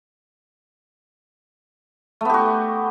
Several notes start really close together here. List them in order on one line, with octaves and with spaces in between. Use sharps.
A3 B3 G4 F#4